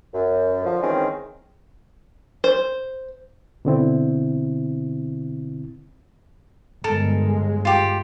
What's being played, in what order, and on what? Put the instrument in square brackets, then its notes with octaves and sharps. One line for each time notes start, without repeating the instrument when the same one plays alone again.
[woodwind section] F#2
D3 F3
D#3 E3 G#3 C4 C#4
[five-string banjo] C5
[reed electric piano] B2 D3 C4 E4
[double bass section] G1 G#3 [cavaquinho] A4 A#4
[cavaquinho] F4 G4